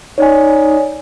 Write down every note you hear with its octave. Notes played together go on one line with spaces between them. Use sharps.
D#4 C#5 D5 G#5